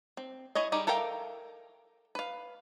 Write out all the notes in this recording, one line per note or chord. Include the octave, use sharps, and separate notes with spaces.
C4
E4 G#4 C#5 D#5
G3 D#4 G4 G#4
A4 A#4 E5 F5 G5
B4 F5